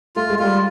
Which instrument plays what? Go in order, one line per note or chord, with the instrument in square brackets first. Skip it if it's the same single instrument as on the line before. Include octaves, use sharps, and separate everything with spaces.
[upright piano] A3 [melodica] F4
[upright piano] G#3
[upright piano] G3 [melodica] F4